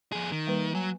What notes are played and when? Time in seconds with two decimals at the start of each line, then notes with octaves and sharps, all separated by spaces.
0.12 F2 G#4
0.32 D#3
0.47 G3 A#3 B4
0.75 F#3 G#5